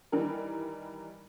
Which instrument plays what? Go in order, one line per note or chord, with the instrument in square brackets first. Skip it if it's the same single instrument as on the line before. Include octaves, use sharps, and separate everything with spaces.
[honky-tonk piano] D#3 E3 G3 A#4